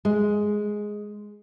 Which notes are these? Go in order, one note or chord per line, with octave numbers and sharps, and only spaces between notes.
G#3